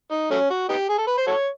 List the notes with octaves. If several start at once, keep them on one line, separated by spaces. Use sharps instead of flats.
D#4
F#3 A3 C#4
F#4
B3 D#4 G4
G#4
A4
B4
C5
F#4 A4 C#5